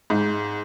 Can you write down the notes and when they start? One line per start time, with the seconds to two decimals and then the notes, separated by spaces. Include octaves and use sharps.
0.10 G#2